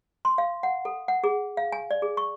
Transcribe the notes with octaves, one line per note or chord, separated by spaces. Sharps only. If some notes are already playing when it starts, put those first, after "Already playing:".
C6
F5
F#5
A4
F#5
G#4
F5
G#5
D5
G#4
C#6